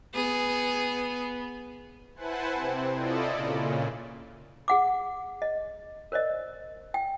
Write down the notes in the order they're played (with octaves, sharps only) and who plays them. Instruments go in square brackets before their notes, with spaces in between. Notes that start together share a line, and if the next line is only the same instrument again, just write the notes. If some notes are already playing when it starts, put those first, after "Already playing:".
[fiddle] B3 [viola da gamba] G#4
[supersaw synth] E4 B4 C5 F#5 G#5 A5
C3 C4
E4 F4 A4 D5 D#5
A#2 C#3
[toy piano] G#4 F#5 D6
D#5
A#4 C5 D5 D#5
G5